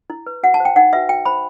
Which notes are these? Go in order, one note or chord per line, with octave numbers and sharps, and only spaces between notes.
E4
B4
F#4 F#5
A5
C5
G5
D#4 F#5
F#4 B4 E5
F#4 G5
C5 B5